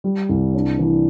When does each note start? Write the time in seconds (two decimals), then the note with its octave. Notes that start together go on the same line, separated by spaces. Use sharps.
0.04 G3
0.29 C2
0.54 D4
0.79 E3